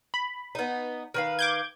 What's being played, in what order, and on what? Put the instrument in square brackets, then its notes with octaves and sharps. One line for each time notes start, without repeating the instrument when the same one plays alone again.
[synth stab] B5
[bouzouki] B3 D#4
D#3 B4 F5
[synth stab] D6 G6 G#6